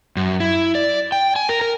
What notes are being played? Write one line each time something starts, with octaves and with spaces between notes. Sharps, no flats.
F#2
E4
D5
G5
G#5
A#4
A#4